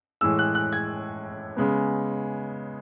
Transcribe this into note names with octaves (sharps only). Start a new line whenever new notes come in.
A2 E3 G#3 E6
F#6
F#6
G#6
C#3 G#3 B3